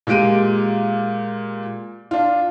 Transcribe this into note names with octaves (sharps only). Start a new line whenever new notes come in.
A#2 G#3 G4 D7 D#7
D4 F4